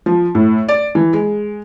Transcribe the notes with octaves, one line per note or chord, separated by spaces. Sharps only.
F3
A2
D5
E3
G#3